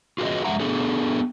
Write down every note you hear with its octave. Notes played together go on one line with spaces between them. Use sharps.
F4 F#4 G#4 A4 B4 D#5
F2 G3 G#3 E5 F#5 A#5
B3 D4 G#4 A4